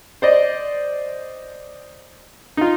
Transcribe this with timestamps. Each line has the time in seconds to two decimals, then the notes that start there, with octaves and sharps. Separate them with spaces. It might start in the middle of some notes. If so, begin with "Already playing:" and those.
0.22 C5 D5 D#5
2.57 D#4 F4